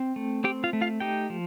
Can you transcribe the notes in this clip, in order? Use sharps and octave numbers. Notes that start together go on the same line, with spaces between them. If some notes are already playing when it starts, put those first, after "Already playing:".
Already playing: C4
A3
C4 G4 G5
F4 F5
A3
F4 F5
D#4 G4 G5
F3